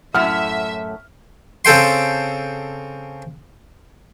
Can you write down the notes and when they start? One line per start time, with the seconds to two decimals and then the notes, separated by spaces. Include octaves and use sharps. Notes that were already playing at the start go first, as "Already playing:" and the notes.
0.14 F#2 A2 E5 F#5 F6
1.65 C#3 C4 A4 G5 C6